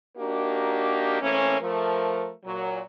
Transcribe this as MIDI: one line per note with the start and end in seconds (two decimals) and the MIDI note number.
0.17 1.21 58
0.17 1.21 62
0.17 1.21 63
0.17 1.21 66
0.17 1.21 67
0.17 1.21 70
1.21 1.60 52
1.21 1.60 57
1.21 1.60 58
1.21 1.60 60
1.21 1.60 61
1.60 2.30 53
1.60 2.30 57
1.60 2.30 70
2.45 2.80 46
2.45 2.80 54